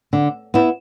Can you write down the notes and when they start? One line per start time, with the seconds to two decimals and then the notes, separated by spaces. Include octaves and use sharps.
0.13 D3
0.54 B3 E4